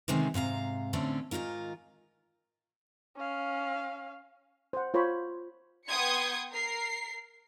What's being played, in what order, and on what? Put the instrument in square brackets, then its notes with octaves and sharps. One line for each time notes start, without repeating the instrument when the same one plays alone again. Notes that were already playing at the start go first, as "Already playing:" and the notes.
[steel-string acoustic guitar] C3 D#3 G#3 C4 C#4
G#2 C3 F5 A#5
A2 D3 A3 C4 C#4
G#2 B2 D#3 F4 A#4
[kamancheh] C#4 F5
[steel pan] C5 F#5
F4 C5 C#5 B5
[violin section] B3 G5 C6 D#6 G#6 C#7
A#4 C7